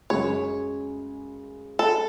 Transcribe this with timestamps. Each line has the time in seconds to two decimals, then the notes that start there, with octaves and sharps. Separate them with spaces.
0.10 F#2 C#3 G#3 C#5
1.79 A4